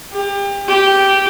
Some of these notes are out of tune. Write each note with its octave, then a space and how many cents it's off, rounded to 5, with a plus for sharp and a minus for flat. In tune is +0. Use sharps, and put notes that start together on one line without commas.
G4 +30
G4 -10